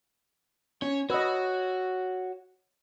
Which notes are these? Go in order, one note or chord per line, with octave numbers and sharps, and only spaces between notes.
C#4 C#5
F#4 B4 C#5 D#5 E6